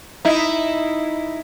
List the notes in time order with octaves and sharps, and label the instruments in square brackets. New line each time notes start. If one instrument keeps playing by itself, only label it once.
[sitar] D#4 E4